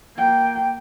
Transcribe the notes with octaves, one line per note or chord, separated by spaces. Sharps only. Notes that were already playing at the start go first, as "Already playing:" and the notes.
A#3 G5